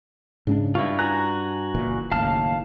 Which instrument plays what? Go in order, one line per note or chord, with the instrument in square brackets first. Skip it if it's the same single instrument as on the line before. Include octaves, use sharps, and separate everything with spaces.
[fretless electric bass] G#2 G#3 D4 [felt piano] C#3
[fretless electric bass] G2 [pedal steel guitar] E4 F4 [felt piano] C#6
[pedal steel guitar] F#4 G#5 A#5 [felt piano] F#6
[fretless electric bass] F#1 A#2 E3
[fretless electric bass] F#1 D#2 A2 [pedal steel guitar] F5 A5 F6